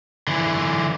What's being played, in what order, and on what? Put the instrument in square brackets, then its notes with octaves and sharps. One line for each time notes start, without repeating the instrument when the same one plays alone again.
[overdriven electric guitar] D3 E3